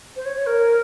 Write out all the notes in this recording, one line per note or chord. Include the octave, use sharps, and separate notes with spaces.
C5
C#5
C#5
A#4